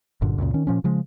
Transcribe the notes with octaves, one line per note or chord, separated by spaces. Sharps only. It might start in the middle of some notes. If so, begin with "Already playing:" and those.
F#1 G2 A#2 D3
C#2 F#2 A#2 C#3
D#3 C#4
A#2 F3 C#4
C#3 F3 G#3